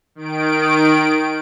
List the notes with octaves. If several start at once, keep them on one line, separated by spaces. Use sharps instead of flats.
D#3 D7